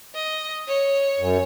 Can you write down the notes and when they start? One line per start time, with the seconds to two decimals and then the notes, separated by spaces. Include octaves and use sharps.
0.15 D#5
0.68 C#5
1.19 F#2